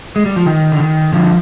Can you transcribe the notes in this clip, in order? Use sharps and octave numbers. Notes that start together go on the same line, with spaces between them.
G#3
G3
F3
D#3
D3
D#3
D3 F3